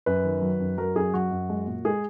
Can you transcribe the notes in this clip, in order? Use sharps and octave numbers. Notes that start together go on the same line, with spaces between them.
F#2 B4
D#3
F#3
F#2
F#3 A#4
F#2 G#4
F#3 F#4
F#2
G#3
A#2
G#3 G#4